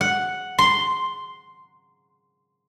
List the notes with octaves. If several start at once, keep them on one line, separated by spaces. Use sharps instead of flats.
F#5
C6